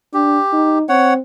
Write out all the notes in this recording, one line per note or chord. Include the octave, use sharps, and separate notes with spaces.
D4 G4
D#4
C4 C#5 F#5